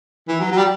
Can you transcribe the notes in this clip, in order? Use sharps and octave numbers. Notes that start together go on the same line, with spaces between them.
E3
F#3
F#3
G3